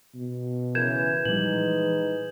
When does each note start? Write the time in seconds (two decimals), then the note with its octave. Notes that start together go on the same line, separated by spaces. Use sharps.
0.15 B2
0.75 C#3 E3 A#4 G6 G#6 E7
1.25 A#2 E3 F3 G3 G#3 D#4 B4 F#7